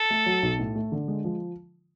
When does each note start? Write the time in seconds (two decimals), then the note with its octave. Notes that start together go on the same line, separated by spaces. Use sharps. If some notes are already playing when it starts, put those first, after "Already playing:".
Already playing: A4
0.10 A3
0.26 F#3
0.43 B1
0.59 A2
0.75 A3
0.92 D3
1.08 G#3
1.24 F3